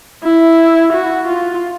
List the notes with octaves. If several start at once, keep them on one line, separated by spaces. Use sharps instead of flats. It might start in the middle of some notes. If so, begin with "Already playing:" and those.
E4
F#4
F4